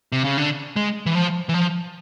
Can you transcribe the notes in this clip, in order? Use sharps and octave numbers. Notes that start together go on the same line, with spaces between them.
C3
C#3
D3
G#3
E3
F3
E3
F3